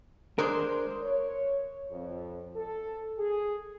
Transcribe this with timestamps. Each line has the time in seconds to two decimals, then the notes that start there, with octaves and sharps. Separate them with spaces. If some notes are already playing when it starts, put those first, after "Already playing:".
0.38 G#3 D4 A#4 C5
1.03 C#5
1.91 F2
2.55 A4
3.19 G#4